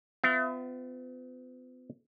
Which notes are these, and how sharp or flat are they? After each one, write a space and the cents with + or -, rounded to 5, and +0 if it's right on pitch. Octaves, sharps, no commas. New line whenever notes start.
B3 +45 F4 +0 E5 +0